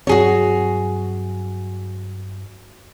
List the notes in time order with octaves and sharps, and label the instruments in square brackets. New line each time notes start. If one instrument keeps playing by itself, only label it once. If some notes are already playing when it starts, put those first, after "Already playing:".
[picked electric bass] G2 F#3 C4 [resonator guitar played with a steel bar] F#4 G#4 C#5